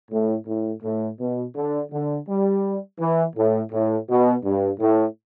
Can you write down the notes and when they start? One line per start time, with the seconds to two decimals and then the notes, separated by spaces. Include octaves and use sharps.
0.11 A2
0.47 A2
0.83 A2
1.19 B2
1.55 D3
1.92 D3
2.28 G3
3.00 E3
3.36 A2
3.72 A2
4.09 B2
4.44 G2
4.80 A2